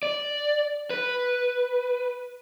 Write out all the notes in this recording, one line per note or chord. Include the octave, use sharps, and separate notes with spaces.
D5
B4